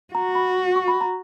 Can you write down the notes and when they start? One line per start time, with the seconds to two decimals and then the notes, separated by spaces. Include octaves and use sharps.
0.14 F#4 A#5
0.35 B5
0.76 C#6
0.88 B5
1.01 A#5